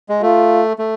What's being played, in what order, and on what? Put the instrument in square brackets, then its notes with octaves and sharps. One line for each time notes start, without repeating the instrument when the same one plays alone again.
[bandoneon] G#3
[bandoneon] A3 [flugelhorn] F4
[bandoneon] A3